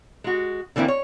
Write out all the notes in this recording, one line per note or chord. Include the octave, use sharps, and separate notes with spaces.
G#3 F#4
D3 E3 A#3 C4 E4
C#5